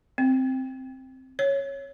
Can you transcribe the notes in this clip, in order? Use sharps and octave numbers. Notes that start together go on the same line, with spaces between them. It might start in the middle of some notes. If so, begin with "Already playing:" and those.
C4
C#5